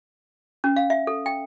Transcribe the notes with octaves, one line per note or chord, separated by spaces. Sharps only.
C#4
F5
E5
A4
G5